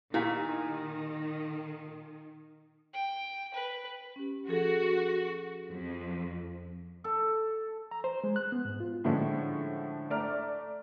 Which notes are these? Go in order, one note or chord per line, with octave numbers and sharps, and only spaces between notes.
A#2 D#3 E4 G4 F5
G5
B4
C#4 G4
F3 F#4 G#4 A4
F2
A4
A#5
C5
G#3
F#6
B3
G#2
F4
A2 D3 F3 G#3 C#4 D4
A3 D5 A#5 F6